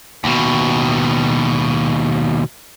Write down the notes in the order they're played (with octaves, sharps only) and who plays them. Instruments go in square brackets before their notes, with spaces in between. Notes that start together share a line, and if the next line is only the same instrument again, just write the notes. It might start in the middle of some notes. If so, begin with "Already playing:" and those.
[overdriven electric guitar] D#2 B2